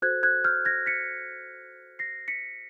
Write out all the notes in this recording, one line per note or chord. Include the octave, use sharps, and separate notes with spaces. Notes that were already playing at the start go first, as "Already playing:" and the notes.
F#4 A4 C5 F#6 G#6
F#6 G#6
F6 G6
G#6 A#6
B6 C#7
A#6 C7
B6 C#7